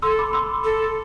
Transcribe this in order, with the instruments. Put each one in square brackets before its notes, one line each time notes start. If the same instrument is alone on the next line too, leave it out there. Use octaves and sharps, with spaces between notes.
[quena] A4 [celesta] C6 E6
[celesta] B5 D6
C6 E6
[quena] A4